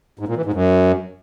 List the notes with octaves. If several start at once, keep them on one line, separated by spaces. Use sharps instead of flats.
G#2
A#2
E3
G#2
F#2